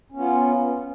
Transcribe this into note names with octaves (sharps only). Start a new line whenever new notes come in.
B3 C#4 F4